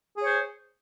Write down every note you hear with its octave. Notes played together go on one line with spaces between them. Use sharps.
G#4 C5 C#5